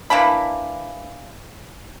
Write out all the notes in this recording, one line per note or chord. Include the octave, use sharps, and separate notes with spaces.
E3 A#3 D4 B5